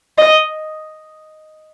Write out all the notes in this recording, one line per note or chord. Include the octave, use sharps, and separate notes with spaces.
D#5